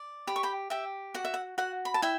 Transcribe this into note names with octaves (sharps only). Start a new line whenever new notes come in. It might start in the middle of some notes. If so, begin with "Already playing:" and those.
Already playing: D5
G4 B5
C#6
G5 B5
G4 E5 G5
F#4 F#5
E5
F#5
F#4 F#5
B5
A5
E4 E5 G5